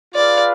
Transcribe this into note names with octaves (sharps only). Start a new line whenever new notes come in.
F4 G#4 B4 D5 F5